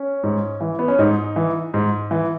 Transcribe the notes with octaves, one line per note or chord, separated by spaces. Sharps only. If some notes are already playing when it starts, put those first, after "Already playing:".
Already playing: C#4
G#2
E3
B3
C#4
G#2 D#4
E3
G#2
E3